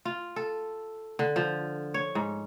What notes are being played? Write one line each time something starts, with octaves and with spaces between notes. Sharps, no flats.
F4
A4
D3
F3
C#5
G#2